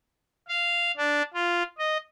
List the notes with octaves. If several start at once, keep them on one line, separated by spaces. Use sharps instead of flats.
F5
D4
F4
D#5